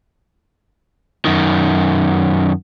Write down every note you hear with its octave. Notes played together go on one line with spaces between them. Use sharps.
F#2 D#3